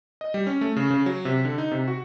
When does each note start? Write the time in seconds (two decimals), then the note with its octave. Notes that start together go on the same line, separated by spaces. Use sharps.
0.21 D#5
0.34 G3
0.47 C#4
0.61 A3
0.76 C#3
0.90 C#3
1.06 F#3
1.25 C3
1.45 D3
1.58 D#4
1.71 C3
1.88 F#4